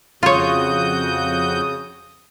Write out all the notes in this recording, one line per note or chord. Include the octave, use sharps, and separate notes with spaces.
F2 C#3 F4 F#4 C#5 D#6 G6